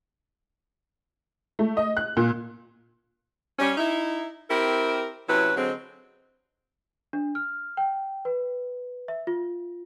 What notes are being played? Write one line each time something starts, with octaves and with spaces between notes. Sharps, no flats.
A3
D#5
F#6
A#2
G3 C#4
D#4 E4
C4 E4 G4 A#4
C3 F#3 C#4 E4 B4
D3 F#3 G#3 C4
D4
F6
G5
B4
E5
F4